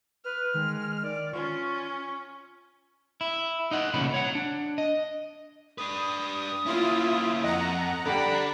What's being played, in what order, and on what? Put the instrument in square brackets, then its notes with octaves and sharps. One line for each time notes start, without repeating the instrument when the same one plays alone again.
[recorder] B4 [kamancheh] F6
[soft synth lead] D#3 [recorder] G#3
[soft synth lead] D#3 [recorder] D5
[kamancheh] C#4 [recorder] F4 [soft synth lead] C#6
[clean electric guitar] E4
D#4 D#5 F#5
C2 A#2 C#3 E3 C#4 B5
C#5 F#5
D4
D#5
[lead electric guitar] D4 B4 [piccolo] D#6
[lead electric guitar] A#3 C#4 [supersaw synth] E4 F4
[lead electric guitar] F2 [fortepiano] D#5 [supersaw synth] F#5 A#5
[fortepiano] D3 G3 [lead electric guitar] D4 [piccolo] B5